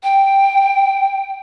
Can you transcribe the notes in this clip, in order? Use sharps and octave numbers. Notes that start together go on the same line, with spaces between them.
G5